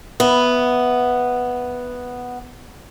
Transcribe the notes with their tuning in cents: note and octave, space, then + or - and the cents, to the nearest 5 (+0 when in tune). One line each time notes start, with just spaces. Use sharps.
B3 +0 E5 +0